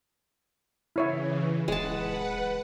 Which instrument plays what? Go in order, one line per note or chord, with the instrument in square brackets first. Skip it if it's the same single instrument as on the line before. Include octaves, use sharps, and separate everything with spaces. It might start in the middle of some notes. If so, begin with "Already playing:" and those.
[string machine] C#3 E3 [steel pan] E4 C#5 E5
[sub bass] D1 [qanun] G#3 A5 [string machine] B4 F#5